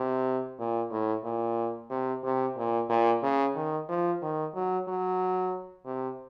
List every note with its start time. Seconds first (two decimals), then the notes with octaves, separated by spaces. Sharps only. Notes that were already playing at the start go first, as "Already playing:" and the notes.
Already playing: C3
0.59 A#2
0.91 A2
1.24 A#2
1.90 C3
2.24 C3
2.57 A#2
2.89 A#2
3.23 C#3
3.55 D#3
3.89 F3
4.22 D#3
4.55 F#3
4.88 F#3
5.86 C3